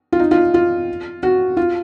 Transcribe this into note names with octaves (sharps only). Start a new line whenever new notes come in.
F4
D#4
F4
F4
F#4
F4